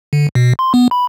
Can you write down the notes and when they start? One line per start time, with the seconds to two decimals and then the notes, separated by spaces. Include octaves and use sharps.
0.13 D3
0.35 B2
0.59 C6
0.74 B3
0.91 B5